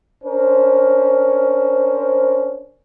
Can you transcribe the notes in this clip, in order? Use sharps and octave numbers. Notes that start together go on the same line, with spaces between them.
C#4 D4 A#4 C5